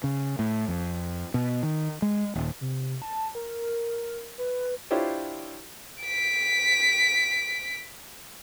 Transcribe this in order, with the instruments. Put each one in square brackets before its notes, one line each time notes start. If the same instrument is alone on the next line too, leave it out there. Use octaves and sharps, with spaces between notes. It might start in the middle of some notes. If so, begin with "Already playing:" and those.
[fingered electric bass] C#3
A2
F2
B2
D#3
G#3
D#1
[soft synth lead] C3
A5
A#4
B4
[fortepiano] D4 E4 F4 G4 C5 C#5
[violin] B6 D7